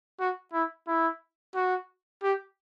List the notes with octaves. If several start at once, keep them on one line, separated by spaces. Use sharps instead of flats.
F#4
E4
E4
F#4
G4